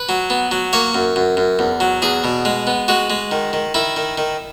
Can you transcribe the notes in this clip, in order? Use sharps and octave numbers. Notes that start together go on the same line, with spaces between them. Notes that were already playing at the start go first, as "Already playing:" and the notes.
Already playing: B4
F#3
B3
F#3
A#3 C#5
F#2
F#2
F#2
E2
F#3
E2 G#4
B2
G#3
B3
G#3 F#4
G#3
D#3
D#3
D#3 E4
D#3
D#3